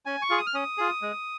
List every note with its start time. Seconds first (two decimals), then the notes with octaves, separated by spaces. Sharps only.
0.06 C#4 G#5
0.22 C#6
0.30 F4 G#4
0.38 D#6
0.47 F6
0.54 C#4 D#6
0.78 F4 G#4
1.02 G#3